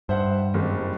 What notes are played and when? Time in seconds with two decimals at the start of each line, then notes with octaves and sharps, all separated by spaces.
0.09 G2 C5 E5 F#5
0.54 F#1 G3 C4